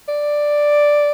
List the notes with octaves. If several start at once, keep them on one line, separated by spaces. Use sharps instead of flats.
D5